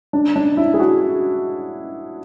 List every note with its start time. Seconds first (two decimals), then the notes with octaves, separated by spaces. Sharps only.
0.13 D4
0.36 D4
0.57 E4
0.74 G#4
0.80 F#4